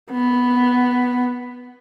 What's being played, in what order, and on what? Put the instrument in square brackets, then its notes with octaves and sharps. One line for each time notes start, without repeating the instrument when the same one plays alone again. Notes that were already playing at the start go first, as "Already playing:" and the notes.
[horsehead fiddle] B3